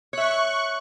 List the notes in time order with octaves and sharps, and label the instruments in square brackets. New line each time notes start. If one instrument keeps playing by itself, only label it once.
[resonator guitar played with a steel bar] C#5 E5 [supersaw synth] C#6 F#6